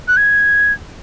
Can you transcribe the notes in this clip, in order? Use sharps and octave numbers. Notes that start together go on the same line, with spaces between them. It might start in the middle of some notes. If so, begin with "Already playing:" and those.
F#6
G#6